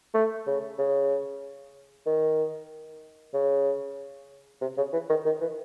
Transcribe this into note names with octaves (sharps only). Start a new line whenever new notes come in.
A3
C#3
C#3
D#3
C#3
C3
C#3
E3
D#3
D#3
E3